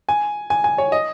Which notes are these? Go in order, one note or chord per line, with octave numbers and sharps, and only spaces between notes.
G#5
G#5
G#5
C#5
D#5